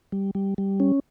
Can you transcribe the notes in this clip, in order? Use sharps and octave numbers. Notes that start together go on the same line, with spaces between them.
G3
G3
G3
C#4